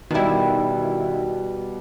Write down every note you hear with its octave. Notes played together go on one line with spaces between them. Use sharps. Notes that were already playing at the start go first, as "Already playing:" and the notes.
B2 D#3 G3 E4